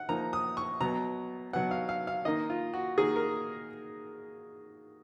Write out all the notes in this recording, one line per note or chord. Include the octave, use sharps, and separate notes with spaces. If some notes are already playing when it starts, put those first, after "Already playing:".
Already playing: F#5
F3 A#3 D#4 A#5
D#6
C#6
B2 F#3 B3 A#5
B2 F#3 B3 F#5
F5
F5
F5
D#3 A#3 D#4 D#5
F4
F#4
D#3 A#3 D#4 G#4
A#4